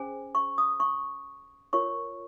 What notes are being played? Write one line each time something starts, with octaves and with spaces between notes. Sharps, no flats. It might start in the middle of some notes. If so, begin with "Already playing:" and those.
Already playing: C#4 G#4 C5 G#5
C#6
D#6
C#6
F4 A#4 C#5 C#6